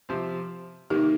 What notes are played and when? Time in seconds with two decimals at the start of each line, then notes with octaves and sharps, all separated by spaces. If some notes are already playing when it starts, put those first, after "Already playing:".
0.09 C3 F3 C4
0.90 C3 D#3 A#3 D#4 G4